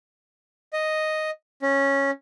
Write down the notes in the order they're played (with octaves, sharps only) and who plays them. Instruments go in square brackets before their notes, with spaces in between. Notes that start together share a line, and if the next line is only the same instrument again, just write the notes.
[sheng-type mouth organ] D#5
C#4